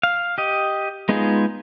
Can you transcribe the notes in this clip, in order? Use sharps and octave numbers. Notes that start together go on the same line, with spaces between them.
F5
G4 D#5
G#3 B3 D#4 F4 G#4